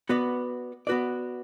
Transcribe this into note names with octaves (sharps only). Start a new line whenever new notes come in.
B3 F#4 B4 D5
B3 F#4 B4 D5